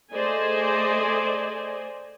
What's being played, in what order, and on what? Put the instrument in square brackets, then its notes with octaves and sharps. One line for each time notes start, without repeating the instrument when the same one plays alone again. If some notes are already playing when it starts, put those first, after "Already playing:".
[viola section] A3 G#4 C5 D5 D#5 G#5